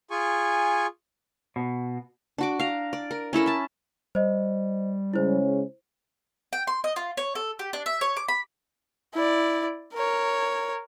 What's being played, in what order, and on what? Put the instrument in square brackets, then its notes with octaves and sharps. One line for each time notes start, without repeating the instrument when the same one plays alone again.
[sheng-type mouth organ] F4 G#4 G#5 C#6
[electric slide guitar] B2
[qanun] D4 F#4 D6
F5 A#5
D5
A#4
C#4 E4 A4 A#4
E5 A5
[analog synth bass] G3 [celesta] C5 D#5
[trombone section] C#3 G#3 C#4 [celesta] E4 C5
[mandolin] G5
C6
D#5
F4
C#5
A4
G4
D4
E5
C#5
D6
B5
[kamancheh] E4 D5
A#4 C#5